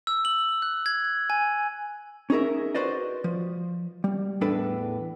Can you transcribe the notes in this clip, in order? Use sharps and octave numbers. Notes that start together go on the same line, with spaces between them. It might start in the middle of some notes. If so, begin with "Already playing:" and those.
E6
F#7
F#6
G#6
G#5
C#4 D#4 G#4 A#4 E5
F#4 B4 C5 D5 D#5
F3
G3
E2 A2 D4 A4 B4